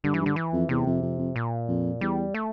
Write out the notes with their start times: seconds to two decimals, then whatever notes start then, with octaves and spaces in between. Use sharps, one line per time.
0.04 G2 D3
0.14 E3
0.21 G2
0.26 D3
0.36 E3
0.53 F2
0.69 E2 C3
0.86 F2
1.02 F2
1.19 F2
1.36 A#2
1.68 F2
2.01 E2 G3
2.34 A3